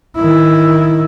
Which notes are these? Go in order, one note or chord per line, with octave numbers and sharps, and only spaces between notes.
D#3 E4